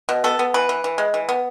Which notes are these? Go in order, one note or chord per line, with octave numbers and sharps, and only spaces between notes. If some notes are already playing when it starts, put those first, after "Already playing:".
B2
B3 A4
B3
E3 B4
E3
E3
G#3
E3
B3